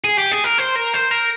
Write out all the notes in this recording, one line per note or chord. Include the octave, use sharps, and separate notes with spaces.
G#4
G4
G#4
A#4
C5
A#4
C5
A#4